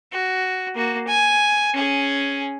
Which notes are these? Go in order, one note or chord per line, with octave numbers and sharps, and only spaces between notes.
F#4
A#3 F#4
G#5
C#4 G#4